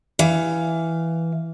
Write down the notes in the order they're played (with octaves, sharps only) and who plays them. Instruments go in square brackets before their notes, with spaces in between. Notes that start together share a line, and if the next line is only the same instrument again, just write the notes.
[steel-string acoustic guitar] E3 F5